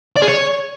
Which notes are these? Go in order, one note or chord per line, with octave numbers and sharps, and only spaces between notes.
D5
G#4
C#5